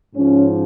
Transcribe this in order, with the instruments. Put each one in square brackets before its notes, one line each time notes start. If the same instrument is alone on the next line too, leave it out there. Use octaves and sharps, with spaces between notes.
[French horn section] G#2 F3 C#4